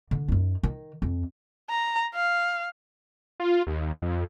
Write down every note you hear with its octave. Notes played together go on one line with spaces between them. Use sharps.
D3
F#2 D#4
D#3
F2
A#5
F5
F4
D#2
F2